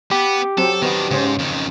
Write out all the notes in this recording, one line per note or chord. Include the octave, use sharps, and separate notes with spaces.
B3 G4
F#3 C4 A4
D#3 B3 D4
G#2 C#3 C#4 C5
F2 D#3